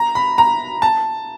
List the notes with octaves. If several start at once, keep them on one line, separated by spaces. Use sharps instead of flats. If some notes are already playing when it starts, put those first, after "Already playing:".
Already playing: A#5
B5
A#5
A5